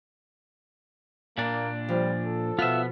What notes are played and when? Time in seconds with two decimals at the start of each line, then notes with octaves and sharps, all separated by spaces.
1.38 A#2 A#3 D4
1.88 F3 G3
2.25 A4
2.59 B2 B3 F4 E5 F6